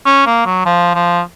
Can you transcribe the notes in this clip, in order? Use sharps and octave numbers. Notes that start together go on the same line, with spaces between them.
C#4
A#3
F#3
F3
F3